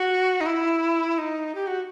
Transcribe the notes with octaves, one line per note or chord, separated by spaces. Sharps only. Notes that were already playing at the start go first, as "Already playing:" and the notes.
Already playing: F#4
D#4
E4
D#4
G4
F#4